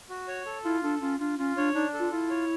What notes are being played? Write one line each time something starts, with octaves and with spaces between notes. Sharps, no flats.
F#4
C#5
A4
E4 F4
D4 A4
C#4 F4
D4 F4
C#4 F4
D4 C#5
D4 D#4
A4
F4
E4 F4
C#5